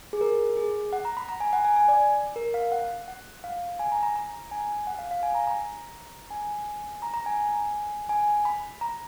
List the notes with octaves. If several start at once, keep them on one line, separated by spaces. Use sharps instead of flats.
G#4
A#4
G#4
F#5
A#5
B5
A#5
G#5
F#5
G#5
G#5
D5
A#4
F5
F#5
F#5
F5
G#5
A#5
A#5
A#5
G#5
F#5
F5
F5
G#5
A#5
A#5
G#5
A#5
A#5
G#5
G#5
B5
A#5